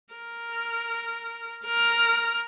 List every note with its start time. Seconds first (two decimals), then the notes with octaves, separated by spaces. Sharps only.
0.14 A#4
1.65 A#4